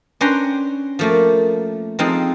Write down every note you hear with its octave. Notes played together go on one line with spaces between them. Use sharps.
C#4 D4 B4 G5 A#5 C6
F3 A3 A#3
F3 G#3 C4 D#4 A4